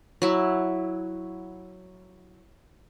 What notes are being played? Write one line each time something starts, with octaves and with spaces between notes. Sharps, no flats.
F#3 E4